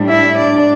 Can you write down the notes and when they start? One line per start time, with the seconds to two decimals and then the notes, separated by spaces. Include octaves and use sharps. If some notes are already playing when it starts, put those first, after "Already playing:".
Already playing: A2 G3 D4
0.09 E4 E5
0.38 D4 D5